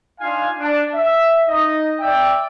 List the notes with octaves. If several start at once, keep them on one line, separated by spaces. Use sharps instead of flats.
D4 D#4 F4 F5 G#5
D4
E5
D#4 D#5
D5 E5 G5